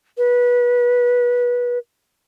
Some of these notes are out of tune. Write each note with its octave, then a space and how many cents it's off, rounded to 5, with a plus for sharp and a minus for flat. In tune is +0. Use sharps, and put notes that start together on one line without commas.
B4 -25